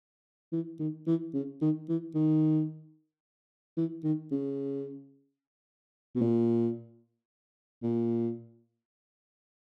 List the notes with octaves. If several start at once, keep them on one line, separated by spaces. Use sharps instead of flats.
E3
D#3
E3
C#3
D#3
E3
D#3
E3
D#3
C#3
B2
A#2
A#2